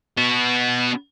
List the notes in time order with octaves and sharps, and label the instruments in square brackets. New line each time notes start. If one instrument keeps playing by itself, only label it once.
[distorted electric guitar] B3 F#4